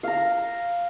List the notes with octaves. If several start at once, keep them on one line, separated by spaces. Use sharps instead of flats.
F5 A#5